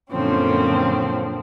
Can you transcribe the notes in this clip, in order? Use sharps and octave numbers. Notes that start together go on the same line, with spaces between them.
F#2 A#2 D3 F3 C4 C#4